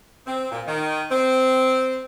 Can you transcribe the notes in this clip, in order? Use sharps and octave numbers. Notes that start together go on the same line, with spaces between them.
C4
A#2
D#3
C4